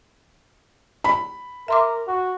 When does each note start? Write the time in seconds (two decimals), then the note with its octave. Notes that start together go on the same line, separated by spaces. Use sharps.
1.04 B5
1.68 A#4 E5 C6 D6
2.08 F#4